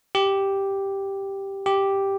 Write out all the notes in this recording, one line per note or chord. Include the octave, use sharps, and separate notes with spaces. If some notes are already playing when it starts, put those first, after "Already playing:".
G4
G4